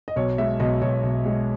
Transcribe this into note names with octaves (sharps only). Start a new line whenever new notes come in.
D#5
B1 C#5
G#3 E5
B1 D#5
B1 C#5
B1
G#3